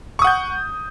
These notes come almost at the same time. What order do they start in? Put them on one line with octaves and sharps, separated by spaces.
C#6 D#6 F#5 G6